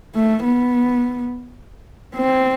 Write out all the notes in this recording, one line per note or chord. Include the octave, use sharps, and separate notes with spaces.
A3
B3
C4